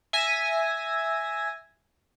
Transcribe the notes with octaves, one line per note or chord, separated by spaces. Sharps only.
E5 G#5 A#6